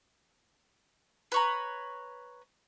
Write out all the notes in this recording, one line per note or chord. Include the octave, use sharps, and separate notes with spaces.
B4 C#5 A#5